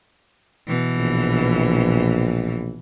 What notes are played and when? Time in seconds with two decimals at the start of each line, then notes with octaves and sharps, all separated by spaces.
0.67 B2 E3
0.97 A#1